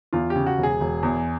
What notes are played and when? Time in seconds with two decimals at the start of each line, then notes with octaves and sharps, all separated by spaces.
0.13 E2 F4
0.30 G4
0.35 C#3
0.47 F#4
0.58 E1
0.63 G#4
0.81 E1
1.03 E2